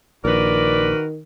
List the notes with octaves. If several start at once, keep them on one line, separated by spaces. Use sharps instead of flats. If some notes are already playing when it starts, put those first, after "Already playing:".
A#1 D#3 F#4 A#4 B4 D5